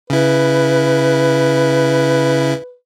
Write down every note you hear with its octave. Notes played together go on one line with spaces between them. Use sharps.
C#3 E4 B4